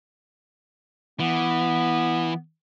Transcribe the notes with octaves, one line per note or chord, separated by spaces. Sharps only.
E3 B3